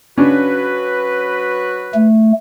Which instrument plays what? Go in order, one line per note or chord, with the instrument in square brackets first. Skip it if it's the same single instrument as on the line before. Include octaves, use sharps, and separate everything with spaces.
[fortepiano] C#3 C#4 D4 [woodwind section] F#3 F#4 B4
[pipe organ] A3